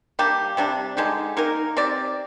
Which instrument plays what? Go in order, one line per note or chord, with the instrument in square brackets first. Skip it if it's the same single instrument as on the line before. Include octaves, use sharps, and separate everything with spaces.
[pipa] G3 A#3 D4 G4
C3 G3 D4
D3 G#3 D#4 G4
A#3 D#4 A#4
C4 G4 D5